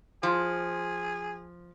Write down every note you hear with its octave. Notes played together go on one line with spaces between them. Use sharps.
F3 G#4